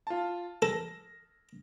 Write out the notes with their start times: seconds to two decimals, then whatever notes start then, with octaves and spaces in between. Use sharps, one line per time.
0.07 F4 A5
0.62 A4 A#6